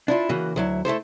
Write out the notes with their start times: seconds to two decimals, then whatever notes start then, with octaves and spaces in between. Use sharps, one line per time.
0.08 D4 E4 F4
0.29 C#3 E3 A#3 F#4
0.56 D2 F#3 E4
0.85 A3 E4 A4 C5